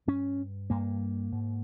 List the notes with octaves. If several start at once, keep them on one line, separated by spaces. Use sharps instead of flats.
G2 C#4
G2 A#3
G#2